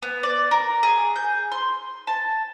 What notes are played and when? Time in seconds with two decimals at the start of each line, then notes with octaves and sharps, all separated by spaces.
0.03 B3
0.23 D5
0.51 A#4
0.83 G#4
1.16 G6
1.52 C6
2.07 A5